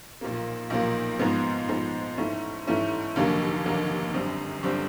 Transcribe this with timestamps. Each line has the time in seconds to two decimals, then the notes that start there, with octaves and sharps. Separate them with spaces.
0.21 B1 A#2 F3 A#3
0.70 B1 A#2 F3 A#3
1.19 G#2 F3 G#3 B3
1.68 G#2 F3 G#3 B3
2.18 G#2 E3 A3 C#4 E4
2.67 G#2 E3 A3 C#4 E4
3.16 F1 D#2 D3 F#3 A#3
3.65 F1 D#2 D3 F#3 A#3
4.14 G1 F#2 D3 G3 C4
4.63 G1 D3 G3 C4